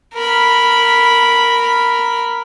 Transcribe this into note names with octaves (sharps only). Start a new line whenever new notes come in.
A#4 B5